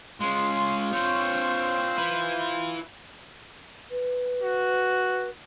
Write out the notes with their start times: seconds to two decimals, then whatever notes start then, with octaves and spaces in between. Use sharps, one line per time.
0.20 G#3 C#4 F4 C6
0.93 C4 C5 C#5
1.97 E4 B4
3.91 B4
4.42 F#4